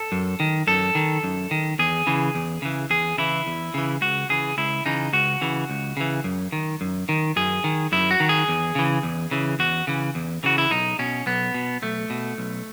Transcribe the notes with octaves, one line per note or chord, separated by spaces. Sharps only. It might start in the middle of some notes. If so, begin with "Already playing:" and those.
Already playing: A4
F#2
D#3
F#2 A4
D#3
F#2
D#3
E2 G#4
C#3 E3
E2
C#3 E3
E2 G#4
C#3 E3 E4
E2
C#3 E3
C#2 F#4
C#3 E3 G#4
C#2 E4
C#3 E3 D#4
C#2 F#4
C#3 E3
C#2
C#3 E3
F#2
D#3
F#2
D#3
F#2 G#4
D#3
F#2 E4
F#4
D#3
G#4
E2
C#3 E3
E2
C#3 E3
E2 F#4
C#3 E3
E2
C#3 E3 F#4
E4
B1 D#4
B2 C#4
B1 B3
B2
B1 A3
B2
B1